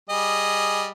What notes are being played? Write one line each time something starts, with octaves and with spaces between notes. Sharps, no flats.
G3 G#4 D#5